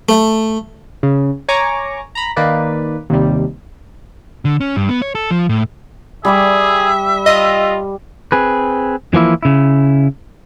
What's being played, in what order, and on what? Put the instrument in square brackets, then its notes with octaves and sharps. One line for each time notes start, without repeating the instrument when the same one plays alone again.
[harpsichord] A3
[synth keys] C#3
C#5 G#5 A#5 C#6 D6
A#5 B5
D#3 A#3 B4 D5
D#2 C3 G3
[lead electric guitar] D3
C#4
G2
B3
C#5
A4
F3
A2
[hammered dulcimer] G3 B5 D6 [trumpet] G#4 [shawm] E5
[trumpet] F4 [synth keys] D#5
[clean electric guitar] C4 G#4 B4
E3 F3 A#3 E4
C#3 E4